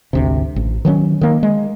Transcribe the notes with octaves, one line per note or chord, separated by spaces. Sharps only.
G#1 D2 C3
A1
D#3 F#3 B3 C#4
D#3 A#3
G#3